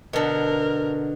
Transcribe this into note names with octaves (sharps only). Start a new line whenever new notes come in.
B2 D3 A#4